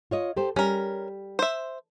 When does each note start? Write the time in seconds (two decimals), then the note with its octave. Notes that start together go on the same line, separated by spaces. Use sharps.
0.11 F4 C#5 D#5
0.36 G4 A4 C5
0.56 G3 C#4 A#4
1.39 C5 E5